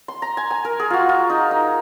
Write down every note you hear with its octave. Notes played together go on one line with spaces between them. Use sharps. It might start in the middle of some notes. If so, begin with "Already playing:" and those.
C6
A#5
G#5
G#5
A#4
G#4
F4 F#4
F4
D#4
D#4